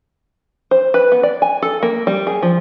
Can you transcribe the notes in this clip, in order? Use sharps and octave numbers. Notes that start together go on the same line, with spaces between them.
C5
B4
B3
D5
G#5
A4
A#3
G3
G#4
F3